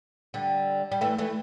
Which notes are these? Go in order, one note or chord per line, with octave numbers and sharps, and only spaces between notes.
D3 G3
G3
E3 A3
E3 A3